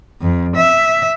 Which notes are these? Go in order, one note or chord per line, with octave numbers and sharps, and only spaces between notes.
F2
E5